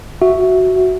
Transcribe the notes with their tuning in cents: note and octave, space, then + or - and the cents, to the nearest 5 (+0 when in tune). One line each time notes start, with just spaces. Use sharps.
F#4 +0 E5 +0